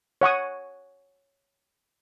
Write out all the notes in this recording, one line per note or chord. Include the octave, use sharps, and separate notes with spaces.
C#5 F#5 C#6 D#6